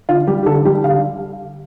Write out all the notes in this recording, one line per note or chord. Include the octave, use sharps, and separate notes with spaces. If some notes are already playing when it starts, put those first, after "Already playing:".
D3 F4
G3 G4
G4
D3 A4
G3 G4
D3 F5